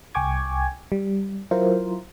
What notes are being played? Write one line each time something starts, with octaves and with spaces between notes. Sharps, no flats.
C2 G5 G#5 C#6 D6 G#6
G3
F#3 E4 F4 A#4 C5